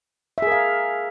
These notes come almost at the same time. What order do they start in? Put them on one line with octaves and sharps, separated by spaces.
E5 G#4 A#4 F5